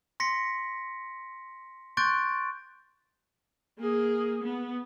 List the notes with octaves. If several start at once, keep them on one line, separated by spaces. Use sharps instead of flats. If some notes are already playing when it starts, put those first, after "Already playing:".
C6 A#6 B6 C#7
C6 C#6 F#6 G6 A6 D7
A#3 G#4
B3